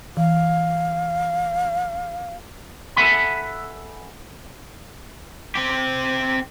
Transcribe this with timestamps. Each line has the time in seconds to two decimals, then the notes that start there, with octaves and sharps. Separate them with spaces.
0.17 E3 F5
2.96 A4 E5 F#5 G#5 B5
5.55 C4 G4